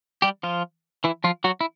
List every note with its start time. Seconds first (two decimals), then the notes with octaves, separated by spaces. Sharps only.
0.22 G3 G4
0.43 F3 F4
1.04 E3 E4
1.24 F3 F4
1.44 F#3 F#4
1.61 E4